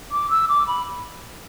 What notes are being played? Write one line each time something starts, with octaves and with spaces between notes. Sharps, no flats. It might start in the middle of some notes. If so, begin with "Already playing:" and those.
D6
E6
D6
B5